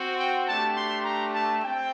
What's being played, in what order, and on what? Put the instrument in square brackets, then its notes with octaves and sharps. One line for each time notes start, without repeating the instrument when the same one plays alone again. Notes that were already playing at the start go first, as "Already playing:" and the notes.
Already playing: [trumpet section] C4 F#4
G5
A3 D4 G4 A5
C6
A#5
A5
C4 G5